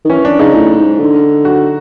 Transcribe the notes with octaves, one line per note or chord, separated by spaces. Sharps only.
D#3
E3 C#4
D4
C#3 D#4
A2
G#2
D3
F#4